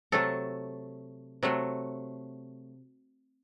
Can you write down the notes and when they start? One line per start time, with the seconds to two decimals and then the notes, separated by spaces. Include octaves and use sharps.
0.12 C3 F#3 A3 A4
1.43 C3 F#3 A3